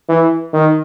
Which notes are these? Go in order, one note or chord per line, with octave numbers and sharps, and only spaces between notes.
E3
D#3